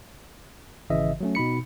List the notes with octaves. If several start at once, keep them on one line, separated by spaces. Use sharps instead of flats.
G#1 C#3 E3 D#5 E5
F#3 A3 C#4
B2 D#4 B5 C#7